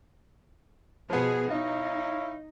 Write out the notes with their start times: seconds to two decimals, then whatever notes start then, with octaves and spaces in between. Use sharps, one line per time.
1.10 B2 F3 B3 G#4
1.50 D#4 E4 C#5 D#5 F5